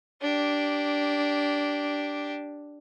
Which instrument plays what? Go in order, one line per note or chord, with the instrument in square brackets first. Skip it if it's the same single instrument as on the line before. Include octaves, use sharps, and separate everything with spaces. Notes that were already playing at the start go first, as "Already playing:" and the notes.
[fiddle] D4 G4